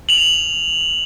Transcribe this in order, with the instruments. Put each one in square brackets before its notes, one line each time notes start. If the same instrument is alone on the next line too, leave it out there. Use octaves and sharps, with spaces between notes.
[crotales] F7 F#7